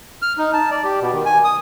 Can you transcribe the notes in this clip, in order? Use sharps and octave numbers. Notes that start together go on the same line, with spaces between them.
F6
D#4
A5
D5
G4
B2
D#3
G#5
D#6